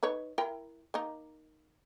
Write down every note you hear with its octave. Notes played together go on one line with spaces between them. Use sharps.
D#4 B4 C#5
E4 A#4 G5
A#3 D#4